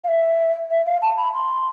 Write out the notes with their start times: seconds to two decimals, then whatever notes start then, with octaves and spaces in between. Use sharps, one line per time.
0.04 F5
0.08 E5
0.71 E5
0.86 F5
1.02 A5
1.17 B5
1.34 C6